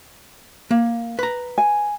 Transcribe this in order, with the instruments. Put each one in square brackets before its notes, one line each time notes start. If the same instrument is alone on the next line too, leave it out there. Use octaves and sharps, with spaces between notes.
[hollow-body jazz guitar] A#3
B4 A#5
[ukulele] G#5